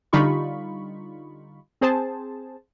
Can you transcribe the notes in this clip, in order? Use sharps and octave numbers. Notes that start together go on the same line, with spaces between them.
D3 G3 D#4 F4 B5 C#6
C4 G#4 C5 A5